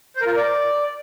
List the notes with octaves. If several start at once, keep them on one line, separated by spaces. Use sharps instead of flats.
C5
A#4
F4
A#4
D5